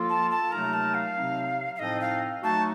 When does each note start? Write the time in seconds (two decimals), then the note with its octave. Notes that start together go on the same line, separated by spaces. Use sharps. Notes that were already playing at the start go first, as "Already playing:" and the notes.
Already playing: F3 A#3 F4 A4
0.09 A5
0.31 A5
0.52 C3 F#3 A3 D#4 A#4 A#5
0.73 A5
0.94 F5
1.16 C3 F#3 C4 D#4
1.76 F5
1.79 A2 F3 C4 D#4 A4 D#5
2.01 F5
2.43 F#3 A3 D#4 F#4 A5